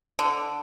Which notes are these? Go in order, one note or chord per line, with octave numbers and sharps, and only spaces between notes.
D3